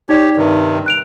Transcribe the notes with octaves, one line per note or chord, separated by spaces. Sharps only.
D#4 G4 C#5 D5
G2 C3 D#3
F#6 D7 F7